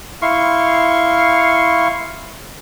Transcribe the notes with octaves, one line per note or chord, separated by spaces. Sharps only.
E4 F5 C6 C#6